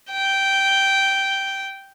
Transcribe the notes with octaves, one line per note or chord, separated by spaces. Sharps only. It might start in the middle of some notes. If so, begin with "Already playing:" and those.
G5